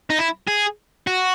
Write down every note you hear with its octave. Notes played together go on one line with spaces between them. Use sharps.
D#4
E4
G#4
F#4